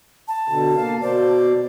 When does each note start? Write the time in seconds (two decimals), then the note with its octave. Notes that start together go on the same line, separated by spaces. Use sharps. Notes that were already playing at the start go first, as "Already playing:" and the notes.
0.28 A5
0.49 B2 D3
0.76 A#3 F5
1.02 B2 C5 D5